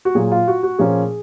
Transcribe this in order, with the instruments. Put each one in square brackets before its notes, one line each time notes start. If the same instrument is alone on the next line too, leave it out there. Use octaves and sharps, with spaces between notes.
[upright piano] F#4
A#2 F#3 A#3 G#4
F4
F#4
F#4
A#2 F3 A#3 C#4 G#4